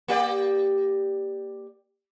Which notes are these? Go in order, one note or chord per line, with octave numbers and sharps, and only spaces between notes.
A#3 G4 D5